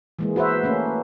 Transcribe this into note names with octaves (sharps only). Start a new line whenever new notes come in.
E3 G#3 A#3
F#4 B4 C5 E5
A3 A#3 C#4